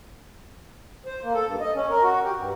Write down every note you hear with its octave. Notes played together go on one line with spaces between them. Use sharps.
C5
A#3
A4
G2
D#5
C#4
A#4
F#4
G4
G2